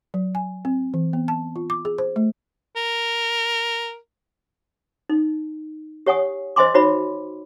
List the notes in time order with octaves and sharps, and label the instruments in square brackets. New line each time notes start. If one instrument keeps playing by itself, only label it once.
[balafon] F#3
G#5
C4
E3
B3
A5
F4
D6
G#4
C5
A3
[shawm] A#4
[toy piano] D#4
G4 C#5 F#5 G#5 D#6
C5 D#5 E5 G#5 C6 D6
D#4 F#4 C5 C#5 E5 B5